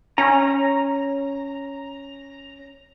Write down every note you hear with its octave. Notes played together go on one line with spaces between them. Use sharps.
C#4 A#5